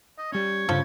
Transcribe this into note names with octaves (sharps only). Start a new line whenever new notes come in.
D#5
G3 C#4 C#5
G2 C#3 F3 A4